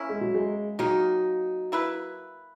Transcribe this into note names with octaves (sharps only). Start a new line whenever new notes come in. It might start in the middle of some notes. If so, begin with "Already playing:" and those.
Already playing: A#3 C#4 E4
G#3
F#3
G#3
D#3 F#3 A#3 D#4
A#3 E4 B4